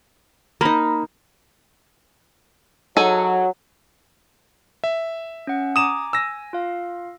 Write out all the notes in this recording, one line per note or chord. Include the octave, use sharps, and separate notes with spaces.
A#3 D#4 A#5 B5
F#3 D#4 G#4 A4
E5
C#4 F#5
G#5 A#5 D6 D#6 E7
G#5 E6 A#6
F4 F5